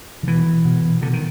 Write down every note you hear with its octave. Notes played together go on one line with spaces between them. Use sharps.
D#3
B2 E3
B2
B2 D3
D#3